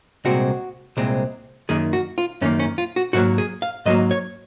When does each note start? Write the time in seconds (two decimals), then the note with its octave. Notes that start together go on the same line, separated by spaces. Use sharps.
0.25 C2 A#2 G#3 C4 F#4
0.97 C2 A#2 G#3 C4
1.69 F#2 D#3 A#3 G#4
1.93 F#4
2.18 F4
2.41 F#2 D#3 A#3 C#4
2.59 C#4
2.78 F4
2.96 F#4
3.13 G#2 F#3 A#3 F#4
3.38 G#4
3.62 F5
3.86 G#2 F#3 A#3 D#5
4.11 C#5